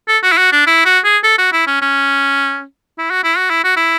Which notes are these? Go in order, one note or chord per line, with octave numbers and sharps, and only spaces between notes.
A4
F#4
E4
F#4
D4
E4
F#4
G#4
A4
F#4
E4
C#4
C#4
E4
F#4
E4
F#4
E4
F#4
E4